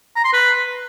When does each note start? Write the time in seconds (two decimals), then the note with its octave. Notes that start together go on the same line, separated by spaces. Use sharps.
0.16 A#5
0.24 C6
0.33 B4